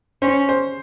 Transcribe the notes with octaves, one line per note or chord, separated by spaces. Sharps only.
C#4 C5
C5